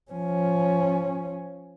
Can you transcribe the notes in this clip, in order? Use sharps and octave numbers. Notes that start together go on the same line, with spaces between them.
F3 C#4